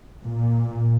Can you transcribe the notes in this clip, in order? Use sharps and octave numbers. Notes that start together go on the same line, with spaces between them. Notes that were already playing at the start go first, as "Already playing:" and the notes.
A#2